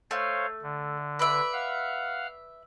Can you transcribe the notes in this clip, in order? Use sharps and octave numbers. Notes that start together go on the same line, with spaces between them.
A3 C5 C#5 F5
D3
B4 D5 E5
F5 F#5 F6